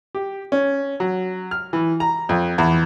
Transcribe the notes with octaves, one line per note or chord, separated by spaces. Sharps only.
G4
C#4
F#3
F6
E3
A#5
F2
E2